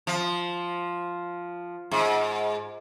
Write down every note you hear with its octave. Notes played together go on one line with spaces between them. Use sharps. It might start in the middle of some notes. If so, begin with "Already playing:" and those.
F3
G#2